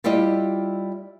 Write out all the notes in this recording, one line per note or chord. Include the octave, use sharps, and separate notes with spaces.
G3 E4 F4 G4 D5 D#5